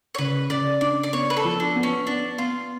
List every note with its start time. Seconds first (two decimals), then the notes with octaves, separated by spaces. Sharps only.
0.15 C#5
0.18 C#3 B4
0.50 C#3 D5
0.81 D4 D5
1.03 D5
1.13 B3 C#5
1.30 B4
1.37 A4
1.44 F3
1.60 D4
1.75 B3
1.83 C#4
2.06 B3 D4
2.38 B3 F4